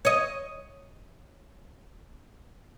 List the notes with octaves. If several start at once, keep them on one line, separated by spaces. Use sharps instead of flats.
C#5 D#5